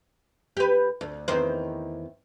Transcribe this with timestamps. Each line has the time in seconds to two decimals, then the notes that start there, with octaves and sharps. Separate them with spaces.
0.57 G4 B4
1.01 D2
1.28 E2 D#3 C5